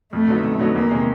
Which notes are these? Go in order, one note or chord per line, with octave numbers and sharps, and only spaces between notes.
F2 A3
D3 F#3 B3 D#4
F2
D3 F#3 B3 D#4
E2 A#3
C3 D#3 G#3